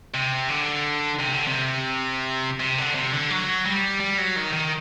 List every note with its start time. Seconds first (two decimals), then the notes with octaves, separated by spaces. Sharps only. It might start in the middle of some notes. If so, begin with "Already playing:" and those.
0.14 C3
0.49 D3
1.19 C3
1.33 D3
1.47 C3
2.60 C3
2.78 D3
2.95 C3
3.13 D3
3.30 F#3
3.66 G3
4.00 G3
4.18 F#3
4.36 D#3
4.53 D#3